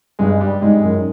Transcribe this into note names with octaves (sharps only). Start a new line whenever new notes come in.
G2 G#3
G3
G#2 G#3
F#2